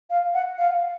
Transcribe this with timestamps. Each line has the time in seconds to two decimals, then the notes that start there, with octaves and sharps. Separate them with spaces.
0.10 F5
0.34 F#5
0.58 F5